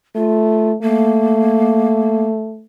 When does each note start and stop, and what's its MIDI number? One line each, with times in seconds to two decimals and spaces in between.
0.16 0.75 57
0.16 0.72 65
0.82 2.66 57
0.82 2.27 58